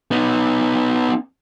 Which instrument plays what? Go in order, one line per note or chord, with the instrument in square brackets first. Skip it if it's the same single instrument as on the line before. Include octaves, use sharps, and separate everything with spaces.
[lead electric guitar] B3 D#4